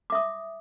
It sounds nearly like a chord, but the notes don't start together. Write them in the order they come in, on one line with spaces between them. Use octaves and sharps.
D6 E5 D#6